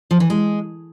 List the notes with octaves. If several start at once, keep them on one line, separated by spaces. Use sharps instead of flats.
F3
E3
G#3